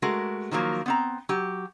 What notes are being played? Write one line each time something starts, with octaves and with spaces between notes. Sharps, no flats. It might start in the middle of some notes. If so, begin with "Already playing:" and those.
G#3 A3 F#4 A#4
D#3 F3 F#3 A#3
B3 C4 A#5
F#3 G4